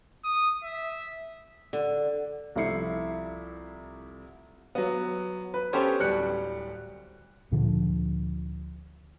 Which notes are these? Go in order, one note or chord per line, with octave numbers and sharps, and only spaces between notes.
D#6
E5
D3
C2 F3 A3 E4 C7 C#7
F#3 B3
B4
B3 C#4 G4 A4 C5 C#5
D1 G3 F#6 C#7
D2 A#2 D3 F3